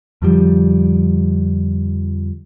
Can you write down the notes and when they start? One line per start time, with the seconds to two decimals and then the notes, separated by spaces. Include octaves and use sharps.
0.22 F2 D3 F3 G3